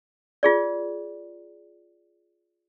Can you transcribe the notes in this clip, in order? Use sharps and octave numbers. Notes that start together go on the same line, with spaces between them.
F4 G#4 D5